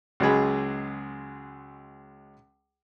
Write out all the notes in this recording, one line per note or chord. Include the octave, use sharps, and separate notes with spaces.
C#2 F#3 G#3 G#4 B5